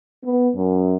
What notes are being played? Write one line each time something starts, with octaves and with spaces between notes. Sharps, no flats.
B3
F#2